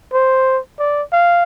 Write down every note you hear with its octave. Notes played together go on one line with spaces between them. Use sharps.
C5
D5
F5